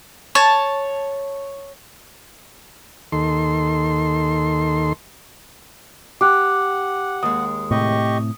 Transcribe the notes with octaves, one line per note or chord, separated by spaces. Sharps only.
C#5 A5
D#2 D#3 A4 C6
G4 F#5 D6 F#6
D#2 G#3 D#6
A2 C3 G4 D#5 C#6